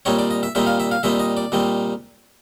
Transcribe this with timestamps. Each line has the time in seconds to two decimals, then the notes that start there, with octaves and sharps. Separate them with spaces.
0.05 A#2 G3 C4 D#4 C#5
0.19 D5
0.31 D#5
0.43 E5
0.55 A#2 G3 C4 D#4 E5
0.67 F5
0.80 E5
0.91 F5
1.03 A#2 G3 C4 D#4 E5
1.20 D#5
1.37 D5
1.52 A#2 G3 C4 D#4